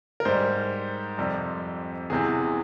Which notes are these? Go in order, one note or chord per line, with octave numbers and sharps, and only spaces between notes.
A#4
G#2 G3 C5
F2 C3 G3
E2 C3 E3 G#4